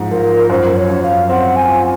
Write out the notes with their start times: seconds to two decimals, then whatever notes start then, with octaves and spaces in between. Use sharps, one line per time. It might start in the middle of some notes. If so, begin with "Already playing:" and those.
Already playing: G#2 F3
0.11 F3 A#4
0.50 F#2 C5
0.77 C#5
0.90 F#2
1.03 F5
1.29 C4 F#5
1.56 G#5
1.69 F4